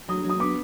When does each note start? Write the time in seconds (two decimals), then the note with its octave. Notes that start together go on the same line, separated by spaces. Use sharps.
0.08 F#3 D#6
0.25 F#3 D#6
0.40 B3 D6